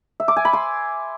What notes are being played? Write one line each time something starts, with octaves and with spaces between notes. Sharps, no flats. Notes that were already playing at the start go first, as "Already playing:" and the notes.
E5
D6
G#5
B5
C6